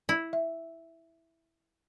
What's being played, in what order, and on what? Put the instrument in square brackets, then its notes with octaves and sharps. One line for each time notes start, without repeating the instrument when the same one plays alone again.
[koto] E4
[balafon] E5